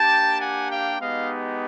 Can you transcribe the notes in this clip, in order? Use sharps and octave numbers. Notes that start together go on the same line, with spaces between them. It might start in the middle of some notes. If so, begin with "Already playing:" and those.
Already playing: A#3 D4 G4 G5 A5
F#5 G#5
F5 G5
G#3 B3 D#4 G4 D#5 F5